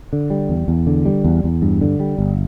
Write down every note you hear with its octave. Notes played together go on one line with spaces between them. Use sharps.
D3
G3
E2
E2
D3
G3
E2
E2
G2
D3
G3
G1